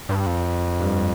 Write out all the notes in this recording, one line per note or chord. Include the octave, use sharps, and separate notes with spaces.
G2
F2
G2